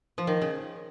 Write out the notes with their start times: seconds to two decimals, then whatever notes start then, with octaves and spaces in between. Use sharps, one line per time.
0.18 F3
0.27 D#3
0.42 C#3